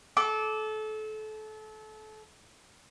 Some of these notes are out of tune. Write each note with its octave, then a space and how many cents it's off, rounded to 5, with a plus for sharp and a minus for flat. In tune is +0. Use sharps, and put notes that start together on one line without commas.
A4 -30 D6 +0